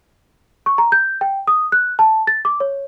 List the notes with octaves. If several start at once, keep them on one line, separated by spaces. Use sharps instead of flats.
C#6
A#5
G6
G5
D#6
F#6
A5
A6
D6
C#5